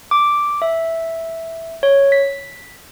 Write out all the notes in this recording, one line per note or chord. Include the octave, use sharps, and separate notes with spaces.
D6
E5
C#5
B6